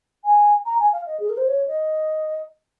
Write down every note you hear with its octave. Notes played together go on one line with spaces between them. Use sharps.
G#5
A#5
G#5
F5
D#5
G#4
A#4
C5
C#5
D#5